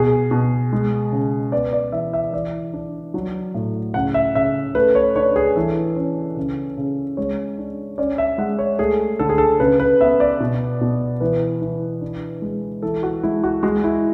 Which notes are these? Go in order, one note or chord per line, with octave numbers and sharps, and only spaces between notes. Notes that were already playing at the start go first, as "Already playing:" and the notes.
Already playing: B2 G#4
B2
G#3
C#3
B3 D5
D5
E3 E5
E5
E3 D5
D4
F#3
A2
C#3 F#5
E5
C#3 E5
A3 B4
C#5
D4 C#5
G#4
E3 A4
C#4
C#3
C#3
G#3 C#5
D4
C#4 D5
E5
G#3 F#5
C#5
A3 G#4
D3 A4
G#4
A4
C#3 B4
B4
B3 E5
D5
B2
B2
E3 B4
E3
D4
G#3
E3 A4
F#4
G#3 E4
F#4
G#3 F#4
E4